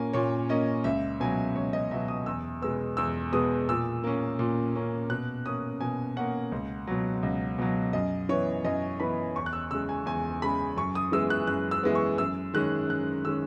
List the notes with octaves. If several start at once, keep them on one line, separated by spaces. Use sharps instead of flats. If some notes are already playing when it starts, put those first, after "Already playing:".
Already playing: A#2 A#3 C#4 G#5
A#2 C#5
A#3 C#4 D#5
C#2 E5
B2 F#3 G#5
C#2 C#5
D#5
B2 F#3 E5
D#6
E2 E6
B2 G#3 B3 E6
E2 E6
B2 G#3 B3 D#6
A#2 E6
A#3 C#4
A#2
A#3 C#4
B2 F#6
A#3 C#4 D#6
B2 G#5
A#3 C#4 F#5
C#2
B2 F#3
C#2
B2 F#3
F#2 D#5
E3 B3 C#5
F#2 D#5
E3 B3 B5
E2 C#6
F#6
E6
C#3 G#3 E6
G#5
E2 G#5
C#3 G#3 B5
F#2 C#6
D#6
E3 G#3 B3 E6
F#6
F#2 F#6
E6
E3 G#3 B3
C#6
F#2 E6
D#3 G#3 C#4 F#6
F#2 F#6
D#3 G#3 C#4 E6